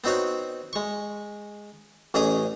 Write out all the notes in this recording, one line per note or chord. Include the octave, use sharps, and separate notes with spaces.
B3 C4 D#4 F#4 C#5
G#3 C#6
A1 C#4 G#4 D#5 A#5 D#6